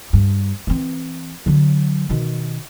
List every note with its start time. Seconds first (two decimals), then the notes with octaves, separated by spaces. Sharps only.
0.13 G2
0.67 E3 C4
1.46 D3 F#3
2.10 B2 D#3